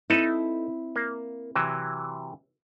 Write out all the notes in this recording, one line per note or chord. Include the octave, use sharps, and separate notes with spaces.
C4 D#4 E4 A4 B4
A#3
C3 E3 F#3